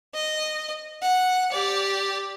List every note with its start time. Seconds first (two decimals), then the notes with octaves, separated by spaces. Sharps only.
0.14 D#5
1.02 F#5
1.52 G4 D5